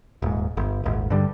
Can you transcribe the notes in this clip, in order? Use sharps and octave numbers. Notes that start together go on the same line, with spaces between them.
D#1 G#2
G1
D#1 G#1
G2 D3 G3